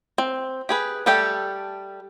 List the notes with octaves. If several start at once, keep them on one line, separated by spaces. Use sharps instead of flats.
C4
G4 G#4 B4
G3 A3 G4 A4 G5